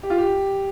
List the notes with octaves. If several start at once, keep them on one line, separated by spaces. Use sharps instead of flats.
G4
F4
G4